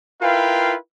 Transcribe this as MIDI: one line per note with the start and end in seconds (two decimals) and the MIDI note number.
0.22 0.75 64
0.22 0.75 65
0.22 0.75 70
0.22 0.75 71
0.22 0.75 77
0.22 0.75 79